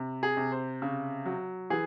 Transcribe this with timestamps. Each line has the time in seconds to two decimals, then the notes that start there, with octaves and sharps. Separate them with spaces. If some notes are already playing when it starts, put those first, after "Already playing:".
Already playing: C3
0.23 G#4
0.37 C3
0.52 C5
0.82 C#3
1.26 F#3
1.70 E3 G#4